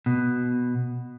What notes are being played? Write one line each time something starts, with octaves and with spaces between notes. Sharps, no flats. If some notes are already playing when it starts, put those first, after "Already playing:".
B2